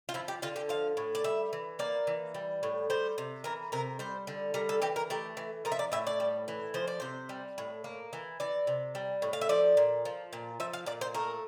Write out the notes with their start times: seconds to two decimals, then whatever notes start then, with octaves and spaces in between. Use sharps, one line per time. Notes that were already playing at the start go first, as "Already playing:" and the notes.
0.09 F4
0.14 F3 E4
0.28 G4
0.42 D3 F4
0.56 G4
0.69 F3 F5
0.97 A2
1.15 D5
1.24 G3 E5
1.53 E3
1.79 A#3 D5
2.07 E3
2.34 G3
2.63 A2
2.90 G3 C5
3.18 C3
3.44 E3 A#4
3.72 C3 A#4
3.99 G3 C5
4.27 D3
4.54 G3 A#4
4.69 A4
4.82 E3 G4
4.96 A#4
5.10 A3 G4
5.37 E3
5.65 F3 A#4
5.72 E5
5.79 D5
5.92 A2 E5
6.07 D5
6.20 G3
6.48 E3
6.74 F3 C5
6.88 D5
7.00 C3 C5
7.29 G3
7.58 A2
7.84 A#3
8.13 E3
8.40 E3 D5
8.67 C3
8.95 G3
9.22 A2
9.33 F5
9.41 E5
9.49 F3 D5
9.77 A#2
10.05 F3
10.33 A#2
10.60 F3 E5
10.73 F5
10.86 A#2 D5
11.01 C5
11.14 A3 A#4